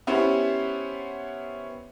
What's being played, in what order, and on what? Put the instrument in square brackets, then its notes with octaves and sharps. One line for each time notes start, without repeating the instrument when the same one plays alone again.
[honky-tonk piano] B3 C#4 E4 G4 C5